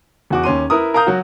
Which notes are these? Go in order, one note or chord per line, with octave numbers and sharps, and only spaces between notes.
E2 F#4 D6
D#2 C#4 C6 D#7
E4 A#4 B4 D#6
A#4 F5 A#5 D#6 G6
F#3 F#4